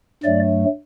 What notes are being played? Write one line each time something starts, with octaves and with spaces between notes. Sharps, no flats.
G2 F#3 A3 D5